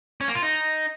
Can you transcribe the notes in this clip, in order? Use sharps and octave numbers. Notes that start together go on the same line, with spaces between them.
C#4
A#3
F4
D#4